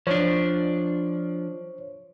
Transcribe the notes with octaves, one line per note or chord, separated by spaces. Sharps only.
F3 D4 C5 C#5